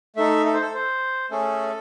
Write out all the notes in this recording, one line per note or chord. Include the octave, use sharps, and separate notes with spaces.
A3 D#4 A4 E5
A4
C5
A4
C5
A3 C#4 G#4 A4